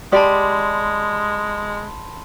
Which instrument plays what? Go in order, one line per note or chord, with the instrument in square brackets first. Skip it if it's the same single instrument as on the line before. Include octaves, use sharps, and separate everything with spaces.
[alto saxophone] G#3 [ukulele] G4 D5 [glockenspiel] A5 B5 C6